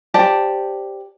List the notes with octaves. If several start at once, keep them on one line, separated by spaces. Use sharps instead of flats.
G4 C5 D5 A5